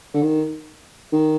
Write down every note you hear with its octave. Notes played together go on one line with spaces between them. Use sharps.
D3
D#3
D#3